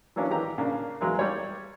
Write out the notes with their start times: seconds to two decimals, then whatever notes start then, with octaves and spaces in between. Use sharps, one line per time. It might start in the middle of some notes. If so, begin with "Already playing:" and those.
0.16 E3 F#3 A#3 C#4 D4
0.30 G#1 E3 G4 A#5
0.58 C#3 A#3 D4
1.01 E2 F#3 G#3 A#3
1.19 G3 C#5